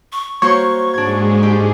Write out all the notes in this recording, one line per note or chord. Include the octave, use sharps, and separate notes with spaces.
C#6
A#3 F#4 C5 C#5 C#7
G#2 G#3 D4 G#6
G4